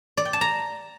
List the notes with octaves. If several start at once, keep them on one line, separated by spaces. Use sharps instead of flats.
D5
G5
A5
A#5